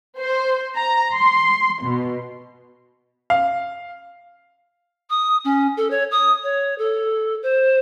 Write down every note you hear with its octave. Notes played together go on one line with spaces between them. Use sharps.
C5
A#5
C6
B2
F5
D#6
C#4
A4
C#5
D#6
C#5
A4
C5